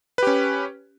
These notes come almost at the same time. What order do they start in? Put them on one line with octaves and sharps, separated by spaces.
B4 G4 C#4